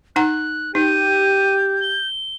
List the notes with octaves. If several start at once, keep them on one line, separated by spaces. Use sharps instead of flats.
D#4 F#5 A#5 F#6
D#4 G4 G6 D#7
G7